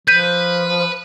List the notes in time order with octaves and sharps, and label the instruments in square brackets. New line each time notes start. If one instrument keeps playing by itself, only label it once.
[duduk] F3 [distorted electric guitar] B4 [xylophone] G6 B6 D#7